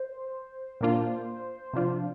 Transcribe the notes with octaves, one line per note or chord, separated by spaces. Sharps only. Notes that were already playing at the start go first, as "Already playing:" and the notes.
Already playing: C5
A#2 A#3 D4 F4
C3 F3 D4 F4